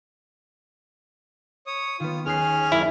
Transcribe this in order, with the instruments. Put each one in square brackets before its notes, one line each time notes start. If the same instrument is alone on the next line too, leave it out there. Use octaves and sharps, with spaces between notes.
[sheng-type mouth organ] C#5 D#6
[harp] D#3 B3 [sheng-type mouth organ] F4
[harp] D#2 F#6 C7 [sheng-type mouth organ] C#4 G#4 F6
[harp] F#1 [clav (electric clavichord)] E4